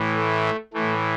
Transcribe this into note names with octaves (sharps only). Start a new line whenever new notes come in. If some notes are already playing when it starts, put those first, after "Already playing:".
Already playing: A2 E3
A3
A2 E3 A3